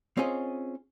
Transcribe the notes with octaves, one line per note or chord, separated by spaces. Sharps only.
C4 C#4 F4 G#4 C#5 D#5